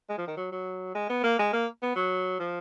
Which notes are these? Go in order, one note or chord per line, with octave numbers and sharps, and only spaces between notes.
G#3
F3
D#3
F#3
F#3
G#3
B3
A#3
G#3
A#3
B3
F#3
F3